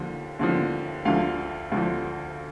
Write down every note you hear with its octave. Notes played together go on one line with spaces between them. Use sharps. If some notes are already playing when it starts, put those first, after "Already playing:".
Already playing: D#2 D3 F3
D#2 D3 F3
D2 D3 F3 F5
D2 D3 F3